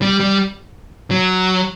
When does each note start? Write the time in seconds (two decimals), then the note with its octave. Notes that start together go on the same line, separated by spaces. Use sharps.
0.02 G3
0.20 G3
1.11 F#3